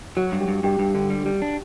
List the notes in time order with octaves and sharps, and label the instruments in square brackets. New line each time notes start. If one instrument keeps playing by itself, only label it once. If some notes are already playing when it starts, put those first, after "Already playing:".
[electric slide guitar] F#3 [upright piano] F#4
[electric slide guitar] G2
[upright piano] G4
[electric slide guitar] G2
[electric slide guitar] G2 [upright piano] G4
[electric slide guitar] G2
D3
G3
G3
D4